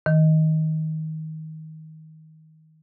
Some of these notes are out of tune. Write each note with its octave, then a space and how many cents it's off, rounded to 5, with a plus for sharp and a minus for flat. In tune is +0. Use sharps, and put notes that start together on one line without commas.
D#3 +20